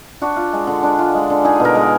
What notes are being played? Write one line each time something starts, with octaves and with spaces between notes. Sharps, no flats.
D4 F#4
F4
G#3
D3
D4
F4
G#3
D3
D#4 G#4
B2
A#4
G#3